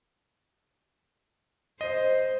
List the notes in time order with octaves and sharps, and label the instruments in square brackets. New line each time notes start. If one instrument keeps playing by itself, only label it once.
[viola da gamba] C5 [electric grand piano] D#5